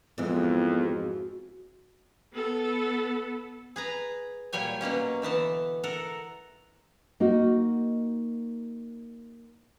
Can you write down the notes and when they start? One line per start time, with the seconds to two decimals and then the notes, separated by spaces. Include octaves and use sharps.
0.18 F2 G#2 E3 G#3 B3
0.81 F#4
2.33 B3 A4
3.76 G#4 B4 A#5
4.53 A#2 F#3 G3 C#5 G#5
4.81 B2 F#3 A#3 C#4
5.22 D3 E3 B3 A5
5.84 A4 A#4 F#5
7.20 A#3 D#4 F#4